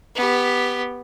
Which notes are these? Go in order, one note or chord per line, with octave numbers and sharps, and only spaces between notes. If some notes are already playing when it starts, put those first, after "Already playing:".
B3 G4